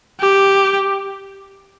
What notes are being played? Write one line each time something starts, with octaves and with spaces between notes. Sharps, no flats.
G4